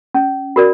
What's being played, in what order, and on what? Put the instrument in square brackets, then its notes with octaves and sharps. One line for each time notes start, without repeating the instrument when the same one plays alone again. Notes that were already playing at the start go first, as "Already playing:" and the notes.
[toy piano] C#4
F#4 A#4 D5